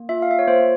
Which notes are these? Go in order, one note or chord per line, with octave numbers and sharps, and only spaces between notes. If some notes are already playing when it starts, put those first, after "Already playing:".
Already playing: A#3
F4 E5
F5
E5
C#5
A#3 C5